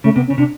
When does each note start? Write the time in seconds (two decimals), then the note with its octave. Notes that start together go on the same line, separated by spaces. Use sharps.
0.04 C#3 A3
0.15 C3 B3
0.27 C#4
0.30 C#3
0.38 C3 D4